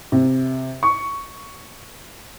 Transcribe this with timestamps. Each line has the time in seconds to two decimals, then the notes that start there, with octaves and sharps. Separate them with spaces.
0.12 C3
0.83 C#6